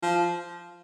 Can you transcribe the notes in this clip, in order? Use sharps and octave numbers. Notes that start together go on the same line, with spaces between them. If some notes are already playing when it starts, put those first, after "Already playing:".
F3